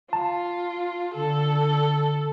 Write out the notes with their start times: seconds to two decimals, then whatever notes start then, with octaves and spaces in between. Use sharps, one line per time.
0.13 F4 A5
1.14 D3 A4